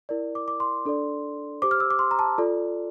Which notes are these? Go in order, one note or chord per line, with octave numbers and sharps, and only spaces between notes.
E4 A#4 D5
D6
D6
C6
D4 A4 D5
G4 C5 D6
F6
E6
D6
C6
A#5
A5
F4 A4 D5